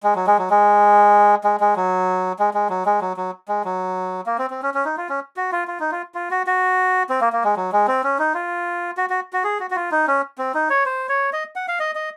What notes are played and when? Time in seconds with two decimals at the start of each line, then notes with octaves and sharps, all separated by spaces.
0.03 G#3
0.15 F#3
0.27 G#3
0.38 F#3
0.50 G#3
1.44 G#3
1.60 G#3
1.76 F#3
2.39 G#3
2.54 G#3
2.69 F#3
2.86 G#3
3.01 F#3
3.17 F#3
3.48 G#3
3.65 F#3
4.26 A#3
4.38 C4
4.50 C4
4.62 C#4
4.74 C#4
4.85 D#4
4.97 F4
5.09 C#4
5.36 F#4
5.52 F4
5.68 F4
5.80 D#4
5.91 F4
6.15 F4
6.31 F#4
6.47 F#4
7.09 C4
7.21 A#3
7.33 A#3
7.44 G#3
7.56 F#3
7.72 G#3
7.87 C4
8.04 C#4
8.19 D#4
8.34 F4
8.97 F#4
9.10 F#4
9.33 F#4
9.44 G#4
9.60 F#4
9.71 F#4
9.76 F4
9.92 D#4
10.07 C#4
10.38 C4
10.54 D#4
10.70 C#5
10.86 C5
11.09 C#5
11.33 D#5
11.56 F#5
11.68 F5
11.80 D#5
11.95 D#5